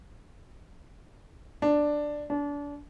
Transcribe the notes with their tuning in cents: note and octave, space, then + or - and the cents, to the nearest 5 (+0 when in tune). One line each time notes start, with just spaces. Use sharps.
D4 +5
D4 -30